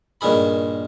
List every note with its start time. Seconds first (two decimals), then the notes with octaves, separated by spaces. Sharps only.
0.21 G2 A#2 D#3 G#4 B5